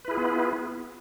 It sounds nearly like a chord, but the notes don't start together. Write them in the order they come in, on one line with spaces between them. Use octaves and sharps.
B4 E4 G#4 F4 B3